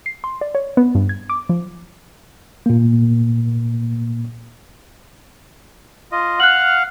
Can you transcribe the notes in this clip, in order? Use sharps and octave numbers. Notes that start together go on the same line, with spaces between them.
C7
C6
D5
C#5
B3
G2
G#6
D6
F3
A#2 A#3
F4 D#5
F5 F#5 F6 F#6 F#7